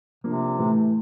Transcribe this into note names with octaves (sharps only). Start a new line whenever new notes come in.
C3 F3 A#3 D4
A2 E3 A3